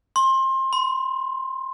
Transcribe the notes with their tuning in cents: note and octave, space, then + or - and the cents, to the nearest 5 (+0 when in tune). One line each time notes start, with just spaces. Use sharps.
C6 +25
C6 -35